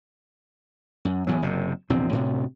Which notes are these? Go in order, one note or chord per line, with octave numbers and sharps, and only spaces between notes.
F#2
E2 A2 F#3
F#1 F#2 C3
A#1 E2 C3 C4
D2 A2 C3